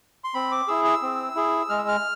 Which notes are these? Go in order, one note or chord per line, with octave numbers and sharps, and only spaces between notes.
C6
C4 B5
D6
E4 G#4 E6
E6
C4
E4 G#4
G#3 F6
E6
F6